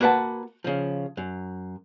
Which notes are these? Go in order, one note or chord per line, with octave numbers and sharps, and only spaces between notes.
A#3 F#4 B4 F#5 A5
C#3 F3
F#2